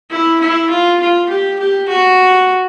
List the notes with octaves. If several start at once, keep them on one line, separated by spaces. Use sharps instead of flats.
E4
E4
F4
F4
G4
G4
F#4